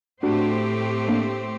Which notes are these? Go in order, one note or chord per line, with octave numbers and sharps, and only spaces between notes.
A2 A3 C4 D4 F#4 G4 C5
A#3 D4